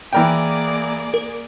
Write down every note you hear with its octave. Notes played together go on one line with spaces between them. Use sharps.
E3 A#3 G#4 A#4 D5 G5
A#4